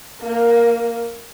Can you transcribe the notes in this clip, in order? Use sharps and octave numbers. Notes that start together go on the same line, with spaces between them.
A#3